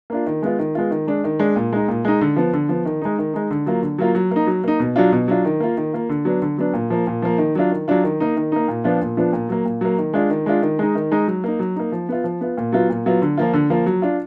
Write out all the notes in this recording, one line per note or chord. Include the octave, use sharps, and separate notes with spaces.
A#3 D4 F4
D#3
G#3 B3 F4
D#3
G#3 B3 F4
D#3
G#3 D4
D#3
G#3 D4
A#2
G#3 D#4
A#2
G#3 D#4
D3
F3 B3
D3
F3 B3
D#3
G#3 D#4
D#3
G#3 D#4
D3
F#3 A#3 F4
D3
F#3 A#3 F4
F#3
A#3 D#4
F#3
A#3 D#4
B2
F#3 D4 F4
B2
F#3 D4 F4
D#3
A#3 F4
D#3
A#3 F4
D3
F#3 B3 D4
D3
F#3 B3 D4
A#2
F3 A#3
A#2
F3 A#3
D#3
F#3 D4 F4
D#3
F#3 D4 F4
D#3
A#3 D#4
D#3
A#3 D#4
A#2
F3 B3 D4 F4
A#2
F3 B3 D4 F4
A#2
F#3 A#3
A#2
F#3 A#3
D#3
G#3 D4 F4
D#3
G#3 D4 F4
D#3
G#3 D#4
D#3
G#3 D#4
F#3
A#3 D#4
F#3
A#3 D#4
F3
B3 F4
F3
B3 F4
A#2
F#3 B3 F4
A#2
F#3 B3 F4
D3
F3 A#3 F4
D3
F3 A#3 F4
F#3
D4 F4